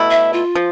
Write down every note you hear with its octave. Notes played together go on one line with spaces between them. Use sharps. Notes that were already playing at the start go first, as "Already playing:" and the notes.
Already playing: B2 A3 E4
E5
F4
F3